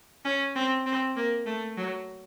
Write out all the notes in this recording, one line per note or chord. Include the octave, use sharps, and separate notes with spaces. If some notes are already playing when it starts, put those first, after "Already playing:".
C#4
C4
C4
A#3
A3
F#3